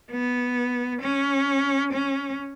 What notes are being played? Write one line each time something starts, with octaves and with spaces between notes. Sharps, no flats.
B3
C#4
C#4